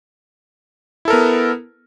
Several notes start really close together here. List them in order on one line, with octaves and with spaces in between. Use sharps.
E4 A4 A#4 B3